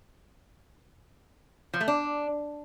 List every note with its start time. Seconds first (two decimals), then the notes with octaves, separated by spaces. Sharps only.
1.74 F3
1.81 A3
1.88 D4